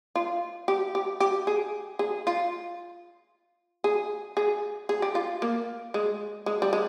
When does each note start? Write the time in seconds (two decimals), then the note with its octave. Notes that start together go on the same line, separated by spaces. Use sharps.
0.16 F4
0.68 G4
0.95 G4
1.20 G4
1.47 G#4
1.99 G#4
2.27 F4
3.84 G#4
4.37 G#4
4.89 G#4
5.02 G4
5.15 F4
5.42 A#3
5.94 G#3
6.46 G#3
6.62 G3
6.73 G#3